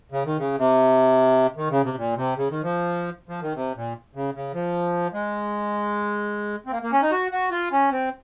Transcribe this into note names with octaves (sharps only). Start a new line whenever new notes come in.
C#3
D#3
C#3
C3
D#3
C#3
C3
A#2
C3
C#3
D#3
F3
F3
D#3
C3
A#2
C#3
C#3
F3
G#3
C4
A#3
A#3
C#4
D#4
F#4
F#4
F4
C#4
C4